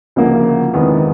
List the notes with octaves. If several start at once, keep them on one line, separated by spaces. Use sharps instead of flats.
D2 C#3 F3 A#3
E2 C3 D#3 G#3 B3